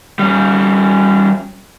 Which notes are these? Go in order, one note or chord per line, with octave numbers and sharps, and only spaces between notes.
G3 C#4